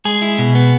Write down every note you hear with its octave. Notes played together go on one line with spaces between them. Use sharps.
G#3 G#4
E4
B2
B3